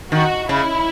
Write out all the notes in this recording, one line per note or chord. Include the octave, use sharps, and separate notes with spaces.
D#3 F#4
C#3 E4